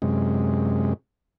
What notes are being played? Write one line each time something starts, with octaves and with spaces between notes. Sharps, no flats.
F#2 C3 G#3